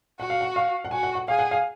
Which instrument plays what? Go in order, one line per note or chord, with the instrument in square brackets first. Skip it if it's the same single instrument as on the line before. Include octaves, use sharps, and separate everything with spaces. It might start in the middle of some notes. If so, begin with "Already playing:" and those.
[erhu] F#4 [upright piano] F#5
[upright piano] F5
F#5
F5
F#5
[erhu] F#4 [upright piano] G#5
[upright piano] F#5
F#5
[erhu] G#4 [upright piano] F5
[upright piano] F#5
F5